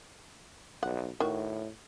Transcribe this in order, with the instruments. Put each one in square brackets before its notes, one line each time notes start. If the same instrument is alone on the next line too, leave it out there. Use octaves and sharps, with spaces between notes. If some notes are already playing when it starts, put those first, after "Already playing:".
[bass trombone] B1 [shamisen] F#5
[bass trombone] A2 [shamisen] D#3 F#4